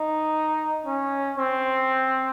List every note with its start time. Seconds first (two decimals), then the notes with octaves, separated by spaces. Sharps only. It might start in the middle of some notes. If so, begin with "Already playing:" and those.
Already playing: D#4
0.86 C#4
1.38 C4